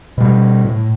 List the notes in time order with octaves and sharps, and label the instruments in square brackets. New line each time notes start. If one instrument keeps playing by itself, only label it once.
[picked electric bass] B2 G3
A2